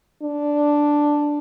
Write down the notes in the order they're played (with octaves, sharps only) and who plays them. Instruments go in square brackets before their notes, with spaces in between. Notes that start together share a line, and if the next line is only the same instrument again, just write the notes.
[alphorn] D4